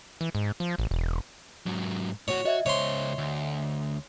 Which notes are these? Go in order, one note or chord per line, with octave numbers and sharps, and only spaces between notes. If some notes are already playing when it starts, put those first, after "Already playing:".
E3
G#2
F3
A1
E1
G#2 F#3
A2 F#4 C#5
F#4 D#5 E5 G#6
C#2 C5 C#5 C6
D2